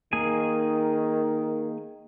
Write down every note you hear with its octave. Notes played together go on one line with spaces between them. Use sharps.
D#3 A#3 G#4 G#5